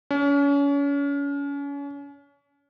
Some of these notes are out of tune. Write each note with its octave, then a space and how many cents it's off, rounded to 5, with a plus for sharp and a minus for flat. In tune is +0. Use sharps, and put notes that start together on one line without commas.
C#4 +35